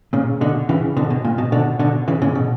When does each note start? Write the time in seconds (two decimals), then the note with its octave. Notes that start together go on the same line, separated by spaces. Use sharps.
0.13 A#2 C#3
0.41 B2 D3
0.69 C#3 E3
0.97 B2 D3
1.10 B2
1.24 A#2
1.38 B2
1.52 B2 D3
1.80 B2 D3
2.08 C#3 E3
2.22 A#2 C#3
2.35 B2